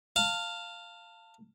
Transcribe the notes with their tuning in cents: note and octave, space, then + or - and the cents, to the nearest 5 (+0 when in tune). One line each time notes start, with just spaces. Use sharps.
F5 +0 A5 +30